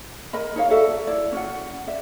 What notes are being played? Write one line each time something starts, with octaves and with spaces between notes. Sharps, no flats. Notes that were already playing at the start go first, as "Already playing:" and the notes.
A#4 D#5 B5
D#4 C#5 F5
F#4 A4 D5 E5
E4 D5
C#4 F#4 F#5
D5 E5